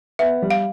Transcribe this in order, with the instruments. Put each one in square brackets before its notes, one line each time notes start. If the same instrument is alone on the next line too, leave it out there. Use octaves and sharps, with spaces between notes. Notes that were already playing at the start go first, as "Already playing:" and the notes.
[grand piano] B3 [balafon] E5
[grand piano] G3
[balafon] F5